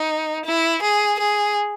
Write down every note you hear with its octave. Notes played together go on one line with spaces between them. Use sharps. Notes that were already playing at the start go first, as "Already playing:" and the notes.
Already playing: D#4
E4
G#4
G#4